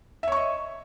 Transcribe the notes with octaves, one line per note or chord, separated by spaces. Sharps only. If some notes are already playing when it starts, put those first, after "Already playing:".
C#5 D#5 E5 C#6